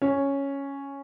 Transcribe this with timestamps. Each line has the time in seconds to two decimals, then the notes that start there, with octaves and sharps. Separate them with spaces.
0.02 C#4